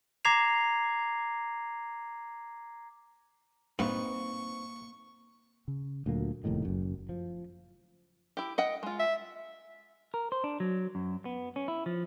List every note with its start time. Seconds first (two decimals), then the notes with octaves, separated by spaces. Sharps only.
0.25 A#5 D6 G#6 A#6 C7 F7
3.79 G2 A#3 C4 D#4 B4 C#6
5.68 C#3
6.06 D2 A#2 F#3 A#3
6.44 F1 D#2 A2 D#3
6.65 F#1 F#2
7.09 F3
8.37 E4 G4
8.58 D#5 F#5 G5
8.83 G#3 F4
8.99 E5
10.14 A#4
10.32 C5
10.44 D4
10.60 F#3
10.95 F#2
11.25 B3
11.56 C#4
11.68 E4
11.86 F3